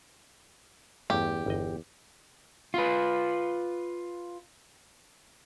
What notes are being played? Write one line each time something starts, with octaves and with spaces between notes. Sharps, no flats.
E2 G2 A3 C#4 G4
G1 E2 D#5
F4 B4